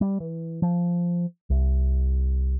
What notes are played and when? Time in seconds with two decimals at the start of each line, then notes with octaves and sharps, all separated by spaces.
0.01 G3
0.20 E3
0.62 F3
1.50 C2